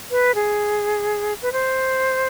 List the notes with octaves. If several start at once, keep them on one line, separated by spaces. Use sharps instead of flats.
B4
G#4
B4
C5